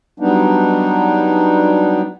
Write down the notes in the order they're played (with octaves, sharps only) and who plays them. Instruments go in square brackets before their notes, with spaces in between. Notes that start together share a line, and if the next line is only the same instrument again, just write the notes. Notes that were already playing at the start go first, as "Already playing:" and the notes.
[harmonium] F#3 G3 B3 D4 D#4